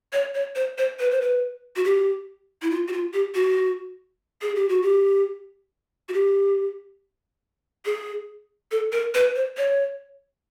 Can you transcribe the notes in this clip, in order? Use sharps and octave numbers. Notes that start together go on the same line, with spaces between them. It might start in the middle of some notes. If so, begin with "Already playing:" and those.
C#5
C#5
C5
C5
B4
C5
B4
F#4
G4
E4
F4
F#4
F4
G4
F#4
G#4
G4
F#4
G4
F#4
G4
G#4
A4
A#4
B4
C5
C#5